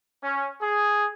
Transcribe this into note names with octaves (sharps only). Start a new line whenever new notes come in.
C#4
G#4